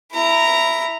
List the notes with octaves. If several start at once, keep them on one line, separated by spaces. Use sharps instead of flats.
E4 A#5